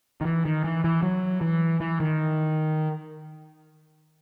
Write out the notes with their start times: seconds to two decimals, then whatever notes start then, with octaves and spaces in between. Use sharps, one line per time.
0.21 D#3
0.25 E3
0.45 D#3
0.64 E3
0.84 E3
1.02 F#3
1.41 E3
1.80 E3
2.00 D#3